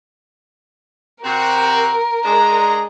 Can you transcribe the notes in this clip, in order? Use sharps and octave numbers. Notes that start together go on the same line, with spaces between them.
C3 C4 F#4 A#4
G#3 D4 A#5